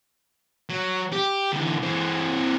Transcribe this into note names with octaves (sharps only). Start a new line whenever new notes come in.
F#3
G4
D3 E3
E3 C4